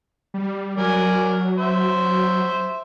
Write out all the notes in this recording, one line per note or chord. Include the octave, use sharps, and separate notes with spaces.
G3
F#3 A#4 D5 G#5
C5 E5